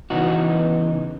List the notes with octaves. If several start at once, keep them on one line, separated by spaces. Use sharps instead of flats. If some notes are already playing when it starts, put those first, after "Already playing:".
C#3 E3 B3 D#4 F#4